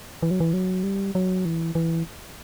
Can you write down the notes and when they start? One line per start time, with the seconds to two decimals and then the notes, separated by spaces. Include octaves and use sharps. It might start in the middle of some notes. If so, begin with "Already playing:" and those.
0.23 E3
0.31 F#3
0.40 E3
0.53 F#3
0.83 G3
1.15 F#3
1.45 E3
1.75 E3